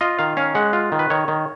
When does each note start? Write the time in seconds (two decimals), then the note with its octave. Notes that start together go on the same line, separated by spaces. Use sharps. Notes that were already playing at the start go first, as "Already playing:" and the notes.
0.01 F4 D#5
0.19 D#3 F5
0.37 C#4 F5
0.55 G#3 F#5
0.73 F4
0.92 D#3
0.99 B4
1.10 D#3 C#5
1.28 D#3